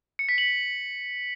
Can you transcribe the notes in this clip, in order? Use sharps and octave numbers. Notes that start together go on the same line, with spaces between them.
C#7
B6
F#7